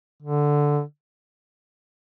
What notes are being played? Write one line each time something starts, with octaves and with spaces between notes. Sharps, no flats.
D3